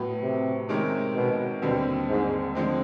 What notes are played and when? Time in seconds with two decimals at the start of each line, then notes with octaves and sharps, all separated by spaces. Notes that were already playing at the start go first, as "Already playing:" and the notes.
Already playing: A2 F#3 B3
0.22 C3
0.69 C3 D#3 G#3 C#4
1.15 B2
1.62 D#2 B2 D3 G3 C4
2.09 G#2
2.55 D3 F3 G#3 C4